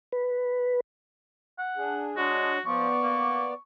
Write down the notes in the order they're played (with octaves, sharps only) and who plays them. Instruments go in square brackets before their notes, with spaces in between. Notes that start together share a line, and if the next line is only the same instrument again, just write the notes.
[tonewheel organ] B4
[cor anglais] F#5
[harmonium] D4 G#4
[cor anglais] G#3 [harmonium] D4 C#5 D#5 [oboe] F#4
[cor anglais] F3 [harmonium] B3 D5 [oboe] C#6
[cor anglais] A#3